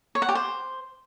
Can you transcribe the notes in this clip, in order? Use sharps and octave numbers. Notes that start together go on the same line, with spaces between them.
C#5
F#5
G4
C5